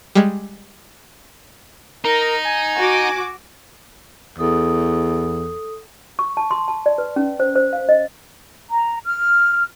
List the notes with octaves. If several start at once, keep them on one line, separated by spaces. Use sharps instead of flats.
G3 G#3
D#4 A#4
G#5
F#4 D6
E2 A4 D#6
C#6
A5
C6
A5
D5
B4
C#4
C5
C5
F5
D#5
A#5
F6